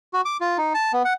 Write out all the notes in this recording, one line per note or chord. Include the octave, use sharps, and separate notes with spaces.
F#4
D6
F4
D#4
A5
B3
F#5